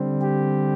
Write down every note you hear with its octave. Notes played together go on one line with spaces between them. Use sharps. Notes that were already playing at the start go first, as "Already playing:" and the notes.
Already playing: D3 G3 C4
G4